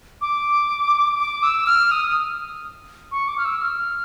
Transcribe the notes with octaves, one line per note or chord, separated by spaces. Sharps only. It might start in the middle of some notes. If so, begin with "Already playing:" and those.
D6
D6
E6
F6
D#6
C#6
D6
F6
E6
F6